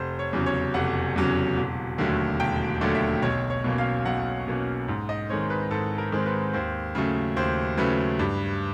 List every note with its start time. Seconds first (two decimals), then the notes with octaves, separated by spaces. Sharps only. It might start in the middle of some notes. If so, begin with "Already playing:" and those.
Already playing: F1 C5
0.19 C#5
0.33 E2 C#3 F#3
0.46 C#5
0.74 F1 F#5
1.16 E2 C#3 F#3
1.57 E1
1.98 D#2 D3 F#3 A3
2.40 E1 G5
2.81 D#2 D3 F#3 A3
2.95 E5
3.22 B1 C#5
3.50 C#5
3.64 B2 F#3 A#3 C#4
3.78 F5
4.05 B1 F#5
4.47 B2 F#3 A#3 C#4
4.88 G#2
5.09 D#5
5.29 D#3 G#3 C4 C#5
5.50 B4
5.71 G#2 A4
5.98 A#4
6.12 D#3 G#3 C4
6.26 B4
6.53 D#2 C5
6.95 C#3 F#3 A3
7.36 D#2 C5
7.77 C#3 F#3 A3 B4
8.19 G2